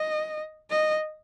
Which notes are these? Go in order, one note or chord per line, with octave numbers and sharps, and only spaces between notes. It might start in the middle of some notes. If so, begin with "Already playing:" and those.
Already playing: D#5
D#5